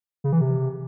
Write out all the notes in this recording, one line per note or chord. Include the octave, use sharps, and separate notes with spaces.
C#3
E3
C3